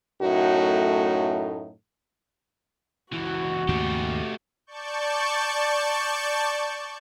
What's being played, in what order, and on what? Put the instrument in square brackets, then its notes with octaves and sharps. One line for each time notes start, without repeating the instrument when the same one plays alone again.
[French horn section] F#2 A2 A3 D#4 F#4
[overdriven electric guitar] C#2 E3 [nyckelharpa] F#4
[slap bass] D#2 G#2 C#3 [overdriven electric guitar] A3 G4
[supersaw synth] D5 A5 C#6 G6